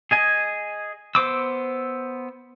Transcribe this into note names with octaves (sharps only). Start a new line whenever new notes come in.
G#4 D#5 G#5
B3 C5 D6 E6